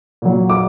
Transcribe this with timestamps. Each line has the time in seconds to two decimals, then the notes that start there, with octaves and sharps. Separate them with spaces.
0.22 A#2 F#3
0.50 D6